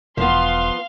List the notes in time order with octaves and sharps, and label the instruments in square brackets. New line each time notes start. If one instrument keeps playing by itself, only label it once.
[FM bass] E1 [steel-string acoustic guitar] F3 B3 [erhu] F5 [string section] C6